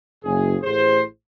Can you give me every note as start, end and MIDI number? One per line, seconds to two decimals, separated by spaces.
0.23 0.55 30
0.23 0.55 68
0.63 1.01 33
0.63 1.01 45
0.63 1.01 68
0.63 1.01 72